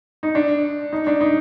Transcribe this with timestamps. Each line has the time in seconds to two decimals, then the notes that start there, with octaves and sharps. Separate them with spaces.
0.23 D#4
0.35 D4
0.93 D#4
1.07 D4
1.21 D#4